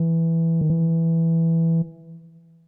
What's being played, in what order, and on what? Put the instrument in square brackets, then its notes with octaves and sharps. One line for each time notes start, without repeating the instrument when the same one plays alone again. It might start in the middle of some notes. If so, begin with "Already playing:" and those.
Already playing: [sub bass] E3
D#3
E3